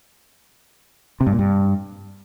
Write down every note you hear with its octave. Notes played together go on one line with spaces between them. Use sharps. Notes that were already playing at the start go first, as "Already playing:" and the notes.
C3
G2
A#2
G2